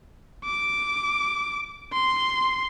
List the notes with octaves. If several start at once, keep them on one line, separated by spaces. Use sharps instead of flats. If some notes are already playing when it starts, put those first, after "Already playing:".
D6
C6